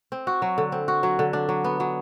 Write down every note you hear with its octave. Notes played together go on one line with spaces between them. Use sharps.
C4
F#4
F#3
D3
C4
F#4
F#3
D3
D4
F#3
B3
F#3